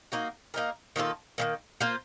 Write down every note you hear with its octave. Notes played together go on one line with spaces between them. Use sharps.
A#3 D#4 F#4
A#3 D#4 A#4
D#3 A#3 F4 A4
D#3 F#3 A#3
A#3 F4 C5